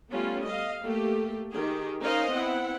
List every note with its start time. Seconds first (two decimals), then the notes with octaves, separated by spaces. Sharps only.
0.10 G3 A3 B3 C#4 F4
0.44 D#5 F5
0.82 A3 A#3 G4
1.51 D#3 G4 G#4
2.00 C#4 D#4 A#4 C5 D#5 F5
2.31 B3 C4 E4 F#5